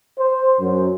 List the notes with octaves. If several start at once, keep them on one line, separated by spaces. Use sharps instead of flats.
C5
F#2